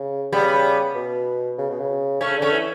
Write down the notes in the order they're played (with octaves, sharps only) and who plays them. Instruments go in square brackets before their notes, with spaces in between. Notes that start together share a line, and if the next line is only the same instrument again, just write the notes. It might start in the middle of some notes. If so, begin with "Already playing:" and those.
Already playing: [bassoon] C#3
[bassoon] C#3 [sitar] G3 B3
[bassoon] B2
C#3
B2
C#3
[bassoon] C#3 [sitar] A3 C#4
[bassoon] D3 [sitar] A3 C#4
[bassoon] E3